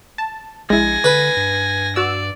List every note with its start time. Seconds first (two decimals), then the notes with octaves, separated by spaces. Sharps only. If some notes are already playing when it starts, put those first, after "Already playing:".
0.18 A5
0.70 A#1 G#3 E4 G#5 A#6
1.04 D3 B4
1.37 G2
1.96 F#4 D5 E6